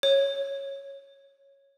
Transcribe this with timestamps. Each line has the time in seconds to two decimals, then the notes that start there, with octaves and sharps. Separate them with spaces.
0.03 C#5